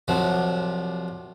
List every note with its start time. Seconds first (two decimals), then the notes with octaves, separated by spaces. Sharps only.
0.08 C2 C3 F3 F#3